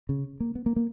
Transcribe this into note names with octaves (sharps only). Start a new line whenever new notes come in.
C#3
A#3
B3
A#3
A#3